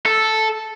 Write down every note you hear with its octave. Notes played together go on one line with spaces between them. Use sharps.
A4